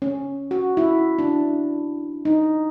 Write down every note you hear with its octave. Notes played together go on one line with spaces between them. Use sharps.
C#4
F#4
E4
D4
D#4